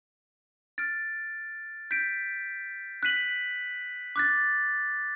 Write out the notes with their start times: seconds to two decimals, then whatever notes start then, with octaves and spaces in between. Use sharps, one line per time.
0.78 F6 A6 D7
1.91 G6 B6 D7
3.03 F#6 B6 D#7 F#7
4.16 D6 F#6 A6